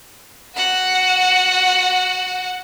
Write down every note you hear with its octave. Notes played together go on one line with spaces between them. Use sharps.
F#4 F#5